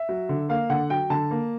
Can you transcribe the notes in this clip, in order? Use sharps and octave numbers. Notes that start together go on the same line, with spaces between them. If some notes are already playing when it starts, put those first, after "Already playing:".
Already playing: E5
F#3
D3
A#3 F5
D3 F#5
F#3 G5
D3 A5
A#3